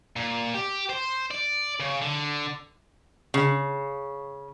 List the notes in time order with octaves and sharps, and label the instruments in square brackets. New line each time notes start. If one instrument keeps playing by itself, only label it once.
[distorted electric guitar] A#2
G4
C5
D5
C#3
D3
[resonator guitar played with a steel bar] C#3